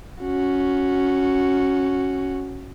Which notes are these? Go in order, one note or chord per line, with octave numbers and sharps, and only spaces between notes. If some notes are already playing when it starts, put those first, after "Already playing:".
C#4 F#4